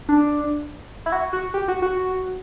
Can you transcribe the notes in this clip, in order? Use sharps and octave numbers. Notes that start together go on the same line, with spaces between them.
D4
E4
F#4
F#4
G4
F#4
F#4